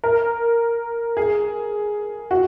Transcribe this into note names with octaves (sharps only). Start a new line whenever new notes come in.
A#4
G#4
F#4